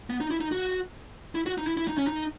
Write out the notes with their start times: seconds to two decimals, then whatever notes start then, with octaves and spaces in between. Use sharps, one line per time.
0.10 B3
0.20 D#4
0.31 E4
0.41 D#4
0.52 F#4
1.35 E4
1.46 F#4
1.58 D#4
1.67 E4
1.77 E4
1.88 D#4
1.98 C#4
2.07 D#4